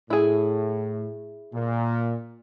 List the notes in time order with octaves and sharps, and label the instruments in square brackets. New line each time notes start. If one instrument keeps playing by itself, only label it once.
[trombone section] A2 [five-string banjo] E4 G#4
[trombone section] A#2